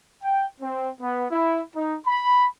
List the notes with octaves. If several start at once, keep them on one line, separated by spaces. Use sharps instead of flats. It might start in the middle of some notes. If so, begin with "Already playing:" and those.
G5
C4
B3
E4
D#4
B5